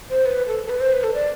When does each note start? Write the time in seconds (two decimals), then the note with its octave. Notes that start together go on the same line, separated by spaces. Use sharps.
0.10 C5
0.26 B4
0.47 A4
0.66 A4
0.70 B4
0.80 C5
0.92 B4
1.04 A4
1.14 D5